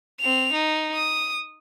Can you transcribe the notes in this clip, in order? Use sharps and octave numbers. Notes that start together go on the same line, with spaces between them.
C4 F7
D#4
D#6